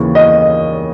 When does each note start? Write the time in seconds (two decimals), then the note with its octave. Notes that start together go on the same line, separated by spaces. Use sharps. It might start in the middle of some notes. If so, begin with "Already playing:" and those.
Already playing: D#2 C#3 E3
0.15 D#5